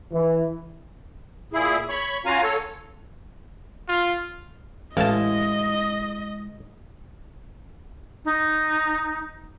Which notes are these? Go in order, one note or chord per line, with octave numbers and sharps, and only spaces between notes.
E3
A#2 E4 G#4
C#5 B5 C#6
C#4 F4 F#4 F5 G#5 A#5
A4 C#5
F4
A1 G#3 E4 D#5 F5 A5
D#4